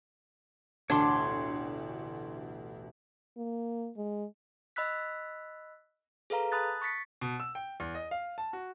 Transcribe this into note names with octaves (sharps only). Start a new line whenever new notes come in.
A1 D2 B2 D4 C#5 C6
A#3
G#3
D#5 B5 E6 F#6 B6
G#4 A4 B4 F5 A#5
A5 B5 D#6 F#6 A6
C#6 A6 B6 C#7
B2
E6
G5
E2
D#5
F5
A5
F#4